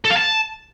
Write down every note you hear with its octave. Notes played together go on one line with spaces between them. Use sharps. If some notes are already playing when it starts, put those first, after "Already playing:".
A4
F5
A5